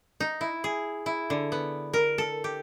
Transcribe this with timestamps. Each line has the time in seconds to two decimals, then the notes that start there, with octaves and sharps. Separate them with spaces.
0.20 D#4
0.41 E4
0.64 G#4
1.06 E4
1.30 D3
1.52 B3
1.93 A#4
2.18 A4
2.44 G4